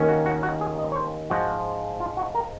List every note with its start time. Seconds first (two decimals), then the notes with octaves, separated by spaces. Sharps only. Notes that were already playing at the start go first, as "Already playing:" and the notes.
Already playing: D#2 D#3 A#3 C#4
0.09 F#4
0.26 F#4
0.43 F#4
0.61 G#4
0.79 D#5
0.92 C#5
0.96 C5
1.30 G#2 F3 G#3 F#4
2.00 F4
2.17 F#4
2.35 A#4